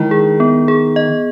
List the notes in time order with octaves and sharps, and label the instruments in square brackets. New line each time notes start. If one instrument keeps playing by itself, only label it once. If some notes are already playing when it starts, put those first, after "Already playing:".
Already playing: [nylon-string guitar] D#3 [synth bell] G#3 E4
[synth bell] G#4
B3
G#4
D#5